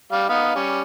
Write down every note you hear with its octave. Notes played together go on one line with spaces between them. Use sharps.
G3 F5
B3 D#4 F5
G3 C#4